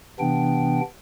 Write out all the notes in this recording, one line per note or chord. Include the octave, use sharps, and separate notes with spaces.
C3 E3 B3 D4 G5